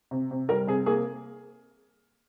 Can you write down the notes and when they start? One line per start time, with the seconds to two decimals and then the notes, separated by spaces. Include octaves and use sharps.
0.11 C3
0.31 C3
0.49 G3 A#4
0.67 C3 G#4
0.86 A#3 G#4